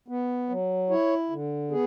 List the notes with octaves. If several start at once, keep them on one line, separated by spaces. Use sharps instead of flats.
B3
F#3
E4 C#5
D3
B3 G#4